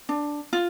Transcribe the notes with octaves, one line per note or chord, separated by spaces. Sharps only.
D4
F4